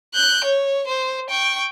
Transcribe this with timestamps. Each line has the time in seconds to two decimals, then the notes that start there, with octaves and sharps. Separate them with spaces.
0.14 F#6 G6
0.45 C#5
0.87 C5
1.30 G5 C#6